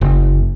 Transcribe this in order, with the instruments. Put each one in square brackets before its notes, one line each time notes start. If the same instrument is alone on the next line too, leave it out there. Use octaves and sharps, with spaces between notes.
[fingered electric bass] F#1